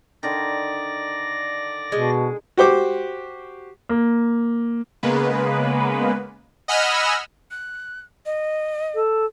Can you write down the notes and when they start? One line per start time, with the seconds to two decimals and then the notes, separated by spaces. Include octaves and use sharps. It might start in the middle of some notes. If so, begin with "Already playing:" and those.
0.23 D3 D#3 D5 A#6
1.92 B2 G#3
2.57 F#4 G4 C5 D6
3.89 A#3
5.03 C#3 G#3 A#3 B3 B4
6.68 D#5 F#5 G#5 B5 E6 F6
7.51 F#6
8.26 D#5
8.95 A4